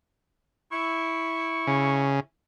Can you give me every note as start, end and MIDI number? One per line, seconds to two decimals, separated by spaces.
0.72 2.24 64
0.72 2.18 85
1.67 2.20 49